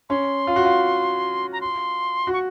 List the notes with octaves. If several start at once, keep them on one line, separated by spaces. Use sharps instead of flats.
C#4 C6
F4
F#4
F4
A#5
C6
F#4
C#6